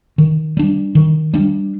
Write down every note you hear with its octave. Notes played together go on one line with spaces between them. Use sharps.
D#3
G3 D4
D#3
G3 D4